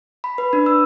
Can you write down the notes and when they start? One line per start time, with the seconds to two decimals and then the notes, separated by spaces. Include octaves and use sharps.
0.24 B5
0.38 B4
0.53 D4
0.66 E6